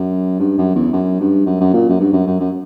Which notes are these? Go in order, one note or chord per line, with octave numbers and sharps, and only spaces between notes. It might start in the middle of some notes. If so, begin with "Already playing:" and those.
Already playing: F#2
G2
F#2
E2
F#2
G2
F#2
F#2
A#2
F#2
G2
F#2
F#2
F#2